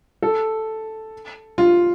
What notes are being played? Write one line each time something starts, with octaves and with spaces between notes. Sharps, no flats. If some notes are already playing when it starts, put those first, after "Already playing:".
A4
F4